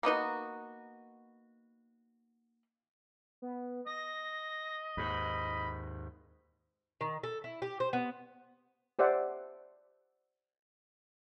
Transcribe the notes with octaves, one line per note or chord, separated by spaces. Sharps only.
A#3 B3 D#4 F#4
B3
D#5 A#6
D#2 G#2 B5
D#3
A4
E4
G4
C5
B3
G4 C5 D5 E5 F#5